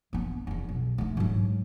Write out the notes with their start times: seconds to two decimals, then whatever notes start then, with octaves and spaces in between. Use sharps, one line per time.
0.13 A#3 B3
0.47 F1 E2
0.69 B1
0.98 A3 D#4
1.17 G#2 F#3